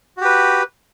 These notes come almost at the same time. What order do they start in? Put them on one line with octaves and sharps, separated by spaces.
F#4 G4 B4